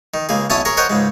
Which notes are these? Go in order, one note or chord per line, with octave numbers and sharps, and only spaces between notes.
D#3
C#2 A#3 G#4
B1 C#4 E4 C#5 A5 D#6
G#4 A#4 C#5 A#5
A#4 C5 C#5 D#5 F#5 G5
C#2 G#2 G#3